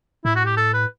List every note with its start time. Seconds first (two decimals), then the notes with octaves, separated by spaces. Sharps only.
0.25 A2 E4
0.36 F#4
0.46 G4
0.57 A4
0.73 B4